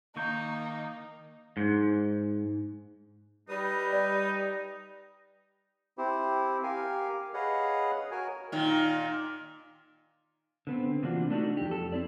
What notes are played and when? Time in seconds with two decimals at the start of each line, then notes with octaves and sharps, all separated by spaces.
0.16 D#3 A#3 D#4 C#6 G6
1.57 G#2
3.49 G3 D#4 B4 D#6
3.93 D5
5.98 C4 E4 G4 C5
6.63 G4 A#4 F5 G#5
7.34 G#4 B4 C#5 D#5 F5 F#5
8.11 F#4 A#4 C#5 G#5
8.52 A#2 D#3
10.67 D3 B3 C4
11.03 C3 E3 A#3 D4 F4 F#4
11.30 A3 D4 D#4 F#4
11.57 F2 G4
11.69 F2 A4
11.92 C4 E4 D5